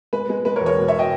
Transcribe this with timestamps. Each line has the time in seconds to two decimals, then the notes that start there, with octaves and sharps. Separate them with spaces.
0.13 G#3 B4
0.29 G#3
0.45 G#3 B4
0.56 A#4 C#5
0.61 E1
0.66 A#4 C#5
0.78 B2
0.88 C#5 E5
0.99 D#5 G5